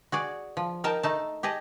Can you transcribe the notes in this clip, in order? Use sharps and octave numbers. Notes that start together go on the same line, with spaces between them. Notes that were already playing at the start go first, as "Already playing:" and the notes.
F#4 G#4 D5
F3
D#4 A#4 G5 A5
A3 D#4 A5
G4 G#4 D#5 A5